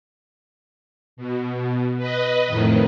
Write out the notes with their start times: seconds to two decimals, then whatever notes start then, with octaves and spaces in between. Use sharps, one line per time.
1.17 B2
1.98 B4 D#5
2.47 F2 A2 D#3